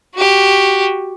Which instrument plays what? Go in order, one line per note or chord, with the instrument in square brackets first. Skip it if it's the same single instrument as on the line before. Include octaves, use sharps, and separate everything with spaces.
[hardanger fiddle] F#4 G4